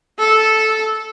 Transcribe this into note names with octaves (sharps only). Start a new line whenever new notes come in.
A4